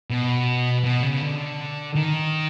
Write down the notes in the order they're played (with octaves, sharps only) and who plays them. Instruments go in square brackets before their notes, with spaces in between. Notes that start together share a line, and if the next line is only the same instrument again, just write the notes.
[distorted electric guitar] B2
B2
C#3
D3
D#3